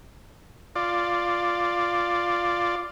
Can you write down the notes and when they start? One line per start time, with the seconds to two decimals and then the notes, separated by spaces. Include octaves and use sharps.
0.76 F4 D5